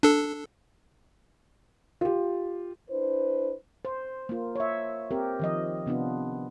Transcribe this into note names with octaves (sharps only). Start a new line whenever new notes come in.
D4 A4
F4 G4
D4 E4 B4 C5
C5
A#3 F4
C#5 E5
C4 G4 A#4
D#3 F3 D#5
C3 B3 D4 F4